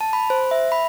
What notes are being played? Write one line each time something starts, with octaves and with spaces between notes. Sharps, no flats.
A5
B5
C5
E5
B5